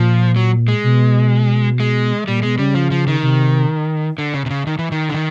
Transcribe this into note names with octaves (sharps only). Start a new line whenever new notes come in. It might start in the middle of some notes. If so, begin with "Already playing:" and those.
Already playing: A#2 F3
F#3
G#3
B2
G#3
A#2 G3
B2 G#3
C#3 G3
F3
F3
D#3
C3
D3
C#3
C3
C#3
D#3
E3
D#3
D3
D#3